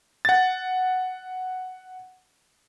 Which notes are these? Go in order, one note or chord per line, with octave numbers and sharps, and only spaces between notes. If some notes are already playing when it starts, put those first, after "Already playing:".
F#5 A6